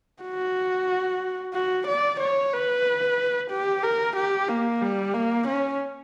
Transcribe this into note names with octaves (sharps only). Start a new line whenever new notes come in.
F#4
F#4
D5
C#5
B4
G4
A#4
G4
A#3
G3
A#3
C#4